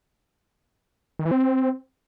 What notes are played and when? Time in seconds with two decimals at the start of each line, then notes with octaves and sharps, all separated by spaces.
1.19 D#3
1.25 E3
1.31 C4